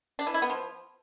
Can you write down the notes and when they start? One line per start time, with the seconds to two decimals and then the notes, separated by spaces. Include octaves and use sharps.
0.19 D4
0.27 E3
0.34 E4
0.42 B3
0.50 F3